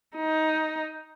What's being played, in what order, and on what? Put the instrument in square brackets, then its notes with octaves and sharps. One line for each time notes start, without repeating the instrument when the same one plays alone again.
[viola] D#4